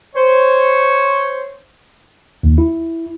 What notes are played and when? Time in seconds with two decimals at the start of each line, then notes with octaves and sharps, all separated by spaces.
0.16 C5 C#5
2.43 D#2
2.58 E4